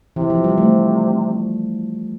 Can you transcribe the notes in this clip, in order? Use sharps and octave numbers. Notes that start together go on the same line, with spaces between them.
C3 E3
F3
G3
A3